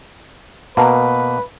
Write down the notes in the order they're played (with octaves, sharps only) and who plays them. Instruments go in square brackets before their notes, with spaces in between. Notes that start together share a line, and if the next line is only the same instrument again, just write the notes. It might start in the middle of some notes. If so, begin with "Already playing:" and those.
[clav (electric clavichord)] B2 A#3 [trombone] B4 [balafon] A5 A#5